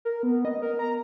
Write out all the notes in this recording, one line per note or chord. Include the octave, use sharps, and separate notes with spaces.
A#4
B3
D#5
A#4
A#5